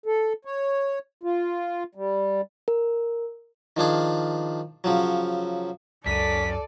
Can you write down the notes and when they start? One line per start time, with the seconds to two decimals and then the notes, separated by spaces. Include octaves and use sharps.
0.06 A4
0.45 C#5
1.23 F4
1.95 G3
2.68 A#4
3.77 D#3 F3 D4 G#4
4.84 C#3 F3 F#3
6.06 C#2 F#2 A4 D5 B6 D#7